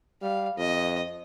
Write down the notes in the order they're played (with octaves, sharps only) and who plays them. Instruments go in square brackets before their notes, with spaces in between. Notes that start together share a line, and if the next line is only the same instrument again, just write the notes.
[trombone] G3 [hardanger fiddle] F5
[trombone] F2 [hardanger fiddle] D#5